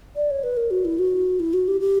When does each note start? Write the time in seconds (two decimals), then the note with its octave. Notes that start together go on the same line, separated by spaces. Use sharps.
0.16 D5
0.30 C#5
0.43 B4
0.57 A#4
0.70 F#4
0.85 E4
0.99 F#4
1.40 E4
1.53 F#4
1.68 G4
1.80 G4